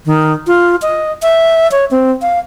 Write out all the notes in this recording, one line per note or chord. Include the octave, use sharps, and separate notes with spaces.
D#3
F4
D#5
E5
C#5
C4
F5